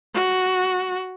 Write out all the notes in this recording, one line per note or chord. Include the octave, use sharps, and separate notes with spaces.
F#4